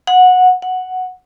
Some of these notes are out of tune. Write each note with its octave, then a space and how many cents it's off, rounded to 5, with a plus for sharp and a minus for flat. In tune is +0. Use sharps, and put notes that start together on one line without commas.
F#5 -15
F#5 +0